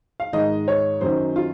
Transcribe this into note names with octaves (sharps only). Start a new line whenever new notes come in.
F5
G#2 D#3 D#5
C#5
F#2 D#3 C5
F4